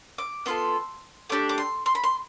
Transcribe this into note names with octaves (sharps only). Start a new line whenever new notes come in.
D6
B3 F4 A4 C6
A3 D4 G4 D6
D6
C6
C6
B5
C6